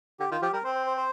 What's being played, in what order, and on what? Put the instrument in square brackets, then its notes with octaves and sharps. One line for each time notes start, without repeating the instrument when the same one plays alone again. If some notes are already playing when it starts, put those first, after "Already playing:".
[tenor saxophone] D3 [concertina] G4
[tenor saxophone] D#3 [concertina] F4
[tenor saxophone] F3 [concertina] G4
[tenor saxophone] G3 [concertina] A#4
[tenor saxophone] C4 [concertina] C5
[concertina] C5
C5
C5